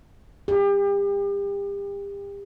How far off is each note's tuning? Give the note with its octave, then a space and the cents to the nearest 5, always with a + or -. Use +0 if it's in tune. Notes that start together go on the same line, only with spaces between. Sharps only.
G4 +35